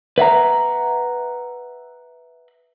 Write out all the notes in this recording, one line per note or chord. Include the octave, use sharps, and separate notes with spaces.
B4 E5 F#5 A#5